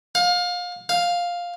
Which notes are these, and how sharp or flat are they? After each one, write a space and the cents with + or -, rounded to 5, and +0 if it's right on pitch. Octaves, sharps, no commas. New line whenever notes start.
F5 +30
F5 +5